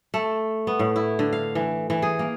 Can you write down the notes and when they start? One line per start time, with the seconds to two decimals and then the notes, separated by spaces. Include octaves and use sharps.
0.14 A3
0.67 B3
0.79 A2
0.96 E4
1.19 D3
1.33 F5
1.55 E3
1.90 E3
2.02 G#4
2.19 A#3